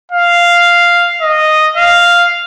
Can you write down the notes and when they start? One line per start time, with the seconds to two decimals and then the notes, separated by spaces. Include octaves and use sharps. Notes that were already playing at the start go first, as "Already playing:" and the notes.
0.12 F5
1.22 D#5
1.76 F5